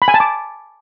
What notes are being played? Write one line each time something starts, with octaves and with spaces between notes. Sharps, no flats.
B5
G#5
A5
D6